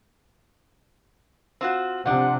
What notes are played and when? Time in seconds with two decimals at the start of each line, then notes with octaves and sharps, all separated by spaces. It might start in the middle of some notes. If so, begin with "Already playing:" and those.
1.61 C4 F4 F#4
2.06 C3 F3 D4 F#5